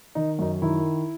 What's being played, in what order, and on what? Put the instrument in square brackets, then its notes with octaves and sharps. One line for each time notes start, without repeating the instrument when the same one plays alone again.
[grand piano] D#3 D#4
F#2 D#4
D#3 E4